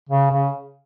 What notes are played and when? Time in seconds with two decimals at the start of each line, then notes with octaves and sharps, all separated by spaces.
0.09 C#3
0.31 C#3